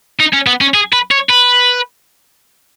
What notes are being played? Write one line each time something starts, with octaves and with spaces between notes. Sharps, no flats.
D#4
C#4
B3
C#4
G#4
B4
C#5
B4